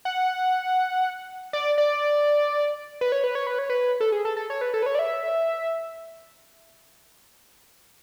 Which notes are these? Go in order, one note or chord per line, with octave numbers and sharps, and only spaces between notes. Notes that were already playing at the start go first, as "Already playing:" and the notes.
F#5
D5
D5
B4
C#5
B4
C#5
B4
C#5
B4
A4
G#4
A4
A4
C#5
B4
A4
B4
C#5
D5
E5